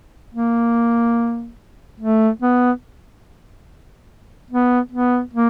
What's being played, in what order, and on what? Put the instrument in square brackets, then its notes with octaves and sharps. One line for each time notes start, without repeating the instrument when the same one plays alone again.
[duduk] A#3
A3
B3
B3
B3
A#3